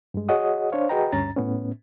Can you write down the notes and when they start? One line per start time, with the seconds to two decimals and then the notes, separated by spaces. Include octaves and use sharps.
0.14 G2 G#3
0.29 F#4 G#4 C#5 D#5 F#5 D#6
0.72 D4 C5 C#5 F5
0.89 F#4 G#4 B4 D#5 G5 A#5
1.12 D2 G2 C#4 A#5 A6
1.36 A2 B3 C#4